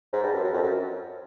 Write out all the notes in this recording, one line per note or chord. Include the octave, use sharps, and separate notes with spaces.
G#2
G2
F#2
F#2
F2
F#2